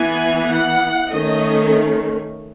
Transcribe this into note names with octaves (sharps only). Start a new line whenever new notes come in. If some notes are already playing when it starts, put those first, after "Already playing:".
Already playing: E3 B3 G#5
F#5
D#3 A3 C#4 D#5